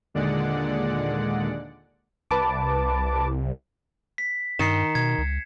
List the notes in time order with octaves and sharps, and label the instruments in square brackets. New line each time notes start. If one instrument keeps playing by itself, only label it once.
[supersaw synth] D#2 A#2 D3 G#3 D5 F#5
[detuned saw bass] C2 [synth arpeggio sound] B4 A5 D6
[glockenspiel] B6
[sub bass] G2 [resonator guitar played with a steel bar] D#3 [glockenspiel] C7 C#7 E7
[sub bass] B2 [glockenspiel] G#6
[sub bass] C#2